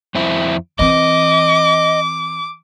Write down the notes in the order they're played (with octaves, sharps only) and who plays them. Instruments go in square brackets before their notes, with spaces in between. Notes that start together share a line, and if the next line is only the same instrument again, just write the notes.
[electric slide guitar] F2 C4 E4
[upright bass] E3 C4 [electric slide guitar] D#5 [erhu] D6